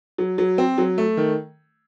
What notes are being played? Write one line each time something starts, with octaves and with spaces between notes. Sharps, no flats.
F#3
F#3
C4
F#3
A3
D#3